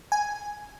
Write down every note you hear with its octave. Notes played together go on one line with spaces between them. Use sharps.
G#5